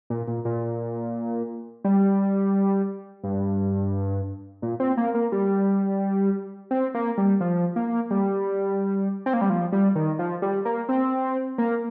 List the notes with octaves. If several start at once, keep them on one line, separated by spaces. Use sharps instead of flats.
A#2
A#2
A#2
G3
G2
A#2
C4
A#3
A#3
G3
C4
A#3
G3
F3
A#3
G3
C4
A#3
G3
F3
G3
D#3
F3
G3
A#3
C4
A#3